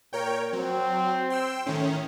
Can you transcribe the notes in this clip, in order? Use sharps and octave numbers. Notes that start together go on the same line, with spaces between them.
A#2 A#4 C#5 G5
F#3 C4
G5 C6 E6
A2 D#3 C#4